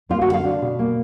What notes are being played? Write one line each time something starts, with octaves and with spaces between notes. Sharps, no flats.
A#3 F4
F#4
D3
F5
D4
B2
A#3